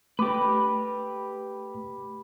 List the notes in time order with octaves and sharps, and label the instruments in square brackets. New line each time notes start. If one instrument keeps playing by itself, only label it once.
[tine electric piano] A3 D6 [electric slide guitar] G4 B4